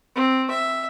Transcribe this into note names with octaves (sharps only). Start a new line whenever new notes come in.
C4
E5